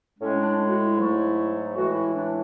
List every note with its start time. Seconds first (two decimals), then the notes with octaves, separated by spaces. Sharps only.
0.20 A2 G#3 C#4
0.39 D4
0.68 F#4
0.78 E4
0.97 G#2 F#3 A3
1.76 A2 E3 G#3 F#4
1.95 E4
2.15 D4